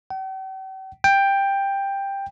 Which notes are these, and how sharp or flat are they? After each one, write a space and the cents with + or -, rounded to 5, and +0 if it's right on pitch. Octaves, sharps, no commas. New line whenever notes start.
G5 -45
G5 +10